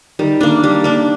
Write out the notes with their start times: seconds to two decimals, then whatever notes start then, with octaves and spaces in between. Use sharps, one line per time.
0.19 D#3 G3
0.41 A#3 D4
0.64 G3
0.84 A#3 D4